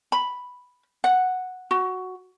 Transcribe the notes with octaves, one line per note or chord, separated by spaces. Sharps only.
B5
F#5
F#4